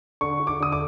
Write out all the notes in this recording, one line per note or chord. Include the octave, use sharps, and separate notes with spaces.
D3 C#6
D3
D6
D3 D#6
D6